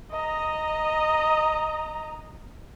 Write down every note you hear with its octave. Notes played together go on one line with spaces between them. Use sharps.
D#5 A#5